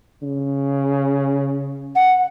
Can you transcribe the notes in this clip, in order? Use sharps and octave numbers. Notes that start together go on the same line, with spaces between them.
C#3
F#5